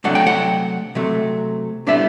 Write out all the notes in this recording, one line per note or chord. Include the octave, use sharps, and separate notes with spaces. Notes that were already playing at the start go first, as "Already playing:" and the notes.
C3 F#3 A3 D4 F#5
G5
F#5
C3 F#3 A3
A2 G3 B3 D4 E5